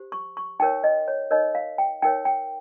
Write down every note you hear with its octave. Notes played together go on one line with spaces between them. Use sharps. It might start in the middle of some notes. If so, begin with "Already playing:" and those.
Already playing: G4 C5
C#6
C#6
D#4 A#4 C#5 G5
D#5
C#5
D#4 A#4 C#5 D#5
F5
G5
D#4 A#4 C#5 G5
G5